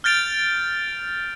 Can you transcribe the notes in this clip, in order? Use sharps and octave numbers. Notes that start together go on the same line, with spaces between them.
F6 G6 A6 D7 F7